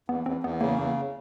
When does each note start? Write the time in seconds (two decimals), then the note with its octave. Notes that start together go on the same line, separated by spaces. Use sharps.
0.08 E2 B3
0.26 E2 C4
0.43 E2 B3
0.61 C#3 A#3
0.79 E2 A#3